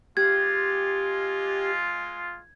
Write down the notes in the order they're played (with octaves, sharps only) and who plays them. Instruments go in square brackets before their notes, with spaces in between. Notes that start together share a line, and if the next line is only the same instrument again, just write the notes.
[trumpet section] G#3 F4 [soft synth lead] G4 [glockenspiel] G#6